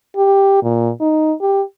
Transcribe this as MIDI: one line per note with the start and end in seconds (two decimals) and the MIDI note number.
0.17 0.60 67
0.63 0.91 46
1.00 1.33 63
1.41 1.62 67